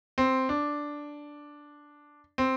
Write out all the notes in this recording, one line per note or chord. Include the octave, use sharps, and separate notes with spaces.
C4
D4
C4